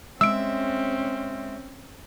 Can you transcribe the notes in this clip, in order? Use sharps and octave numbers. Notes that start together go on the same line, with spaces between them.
G#3 C4 C#4 E5 E6 D7